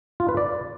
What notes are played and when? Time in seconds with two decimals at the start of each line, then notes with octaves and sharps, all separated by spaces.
0.20 F4
0.29 B4
0.37 D5